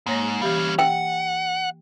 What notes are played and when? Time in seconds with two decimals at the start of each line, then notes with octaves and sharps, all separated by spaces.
0.06 G#2 A#3 C#5 A#6
0.42 E3 G3 C#4 G4 F5
0.79 F#5 G5